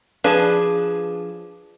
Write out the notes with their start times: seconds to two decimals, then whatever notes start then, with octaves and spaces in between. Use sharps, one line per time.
0.24 F3 D4 G#4 B4